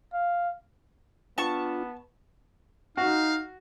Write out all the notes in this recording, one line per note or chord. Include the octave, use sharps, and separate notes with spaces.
F5
B3 D4 F4 A5 C#6
D#4 F#4 F5